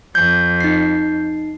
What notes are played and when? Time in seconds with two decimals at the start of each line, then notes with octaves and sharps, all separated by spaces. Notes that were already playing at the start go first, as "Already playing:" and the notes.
0.15 F2 G6
0.61 D#4 C7